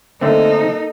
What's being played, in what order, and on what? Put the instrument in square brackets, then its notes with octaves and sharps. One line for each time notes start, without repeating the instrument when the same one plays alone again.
[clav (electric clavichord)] D3 A3 C4 [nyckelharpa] A#3 A4 [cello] D#4